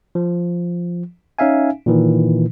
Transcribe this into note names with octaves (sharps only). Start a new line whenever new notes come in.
F3
C#4 D#4 E5 F5 G#5
A#2 D#3 E3